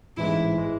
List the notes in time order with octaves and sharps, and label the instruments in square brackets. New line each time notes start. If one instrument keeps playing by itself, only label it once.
[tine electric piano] A1 G#2 E3 G#3 [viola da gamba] E4
[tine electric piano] E3 G#3